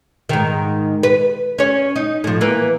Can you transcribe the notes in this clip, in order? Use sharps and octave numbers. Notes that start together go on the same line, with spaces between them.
G#2 D#3
B4
C#4 C#5
D#4
A2 F3
E3 A#3 B3